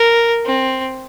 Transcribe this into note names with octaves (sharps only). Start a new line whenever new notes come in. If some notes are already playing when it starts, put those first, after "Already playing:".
Already playing: A#4
C4